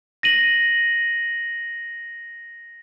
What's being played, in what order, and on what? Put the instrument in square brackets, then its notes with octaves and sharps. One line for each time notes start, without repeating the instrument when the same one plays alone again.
[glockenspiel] A#6 D#7 F#7